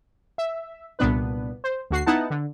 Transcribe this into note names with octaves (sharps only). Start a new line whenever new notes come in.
E5
C2 A#2 B3 D4 B4
C5
D2 F#4 C7
B3 D#4 E4 F#5 A5
D3